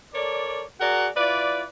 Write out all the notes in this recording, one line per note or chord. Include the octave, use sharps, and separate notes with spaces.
A4 A#4 C#5 D5
F#4 G#4 A#4 D5 F#5 A#5
E4 F4 B4 D5